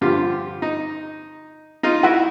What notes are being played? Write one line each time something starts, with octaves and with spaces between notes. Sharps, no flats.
G2 D3 F3 F4 G4
D#4
D#4 F4
E4 F#4